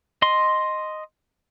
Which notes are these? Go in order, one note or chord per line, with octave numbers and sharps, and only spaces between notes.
D#5 C6